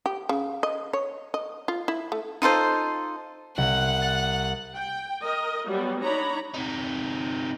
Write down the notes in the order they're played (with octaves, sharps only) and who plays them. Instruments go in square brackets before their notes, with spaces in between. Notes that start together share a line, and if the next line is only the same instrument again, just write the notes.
[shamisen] G4
C#3
D#5
C#5
D#5
F4
E4
A3
[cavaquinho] D#4 F4 A4 C5
[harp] C2 [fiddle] F#5
[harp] A6
[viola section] G5
A#4 D#5
F#3 G3 B3
D4 D#4 C#5 A#5 B5
[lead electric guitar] C3 D#4